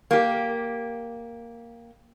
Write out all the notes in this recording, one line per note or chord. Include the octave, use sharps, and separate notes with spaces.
A#3 G4